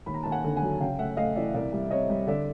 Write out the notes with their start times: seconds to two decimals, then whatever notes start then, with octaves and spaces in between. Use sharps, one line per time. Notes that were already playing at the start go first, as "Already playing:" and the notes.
0.06 D#2 B5
0.14 A#5
0.23 D#2 A5
0.31 F#5 G#5
0.44 D3
0.56 F#5 G#5
0.62 F#3
0.80 C#3 F5 G5
0.99 A3 E5 F#5
1.17 A3 D#5 F5
1.36 E3 D5 E5
1.54 C2 D5 E5
1.73 G3
1.91 C4 C#5 D#5
2.10 G3
2.27 D3 D5 E5